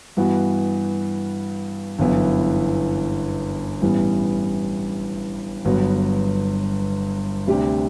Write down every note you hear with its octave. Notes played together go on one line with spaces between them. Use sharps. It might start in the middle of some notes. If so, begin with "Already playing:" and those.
G2 E3 B3 F#4
G1 F#2 E3 B3 E4
A1 G2 E3 G3 B3
G1 G2 F#3 B3
D2 C3 G3 D4 G4